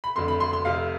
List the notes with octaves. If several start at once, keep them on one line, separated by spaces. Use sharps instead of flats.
B5
F1 F2 D3 C6
B5
C6
C6
F1 F2 C3 F5